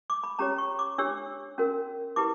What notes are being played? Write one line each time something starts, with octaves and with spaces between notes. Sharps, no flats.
D6
B5
C#4 G4 C#5 A#5
C#6
D6
D4 G4 C#5 E6
C#4 F#4 A#4
E4 G4 B4 D6